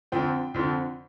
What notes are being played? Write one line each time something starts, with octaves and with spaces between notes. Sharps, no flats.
F2 D3 F3 C4 G5
F2 D3 F3 C4